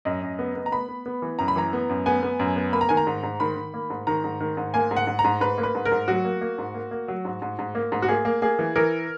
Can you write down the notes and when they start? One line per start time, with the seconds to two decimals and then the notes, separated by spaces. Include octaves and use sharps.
0.05 F#2 D#5
0.22 F#2
0.39 B3
0.56 B3
0.66 A#5
0.72 B3 B5
0.89 B3
1.06 B3
1.22 E3
1.39 F#2 A#5
1.48 B5
1.56 E3 A#5
1.73 B3
1.89 F#2
2.06 B3 G#5
2.23 B3
2.39 F#2
2.56 B3
2.73 A#3 B5
2.81 A#5
2.89 D#3 G#5
2.97 A#5
3.07 G#2
3.23 G#2
3.40 D#3 B5
3.57 D#3
3.74 A#3
3.90 G#2
4.07 D#3 A#5
4.24 G#2
4.41 D#3
4.57 G#2
4.74 A#3 G#5
4.91 G#2
4.97 F#5
5.07 G#2
5.19 A#5
5.24 G#2
5.41 G#2 B4
5.58 A#3
5.63 B4
5.75 G#2
5.85 A#4
5.92 G#2
6.08 F#3 F#4
6.24 A#3
6.41 A#3
6.58 G#2
6.74 A#3
6.91 A#3
7.08 F#3
7.25 G#2
7.42 G#2
7.59 G#2
7.75 A#3
7.92 G#2
8.02 F#4
8.08 A#3 G#4
8.25 A#3
8.42 A#3 G#4
8.59 E3
8.76 E3 A#4